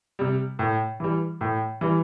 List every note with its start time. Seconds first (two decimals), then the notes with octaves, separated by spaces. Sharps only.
0.19 C3 G3
0.59 A2
1.00 E3 G3
1.41 A2
1.81 E3 G3